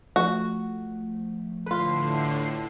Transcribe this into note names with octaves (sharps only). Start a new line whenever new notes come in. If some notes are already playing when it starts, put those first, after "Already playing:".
F3 A3 F#4
A2 D3 F4 B4 C7